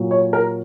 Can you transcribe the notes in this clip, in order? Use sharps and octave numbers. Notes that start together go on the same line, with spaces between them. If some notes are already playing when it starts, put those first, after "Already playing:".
Already playing: A#2 F#3
C#5
A#4